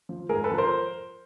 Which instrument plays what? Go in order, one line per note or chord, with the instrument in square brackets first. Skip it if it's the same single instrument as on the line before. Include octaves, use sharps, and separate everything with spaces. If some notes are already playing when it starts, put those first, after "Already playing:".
[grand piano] F3
G#2 G#4 A#4
A4 B4
F3
A#4 C5